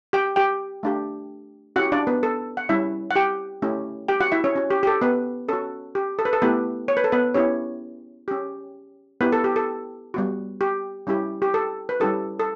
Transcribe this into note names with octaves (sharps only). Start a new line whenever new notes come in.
G4 G5
G4 G5
A3 D4 G4
C#4 E4 F#4 G4 F#5
D4 D5
B3 B4
A4
F#5
G3 C#4 E4 E5
F#5
G4 G5
A3 C#4 E4 G4
G4 G5
F#4 F#5
E4 E5
C#4 C#5
C#4 F#4
G4
G4
A4
B3 B4
C#4 F#4 A4
G4
A4
B4
A4
A3 B3 E4 G4 B4
C#5
B4
A4
B3 B4
B3 C#4 E4 G4 C#5
C#4 G4
B3 E4 G4 B4
A4
G4
A4
G3 B3 F#4
G4
G3 C#4 E4 G4
G4
A4
B4
G3 C#4 E4 G4 A4
A4